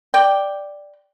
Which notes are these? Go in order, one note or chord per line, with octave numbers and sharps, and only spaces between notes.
D5 G5